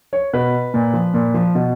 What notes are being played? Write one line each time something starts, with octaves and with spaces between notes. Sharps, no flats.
C#5
B2 B4
A#2
F3
A#2
F3
B2